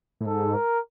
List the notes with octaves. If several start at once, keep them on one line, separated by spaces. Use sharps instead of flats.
A2
G#2 A4
A#4